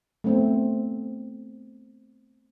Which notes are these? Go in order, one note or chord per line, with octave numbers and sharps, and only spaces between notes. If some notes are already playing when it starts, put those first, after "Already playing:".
A3 B3 C4